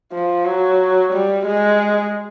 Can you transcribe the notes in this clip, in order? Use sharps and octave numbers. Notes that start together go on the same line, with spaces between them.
F3
F#3
G3
G#3